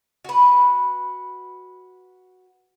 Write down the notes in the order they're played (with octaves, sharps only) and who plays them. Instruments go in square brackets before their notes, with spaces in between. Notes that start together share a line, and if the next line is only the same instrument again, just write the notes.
[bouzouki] F#4 B4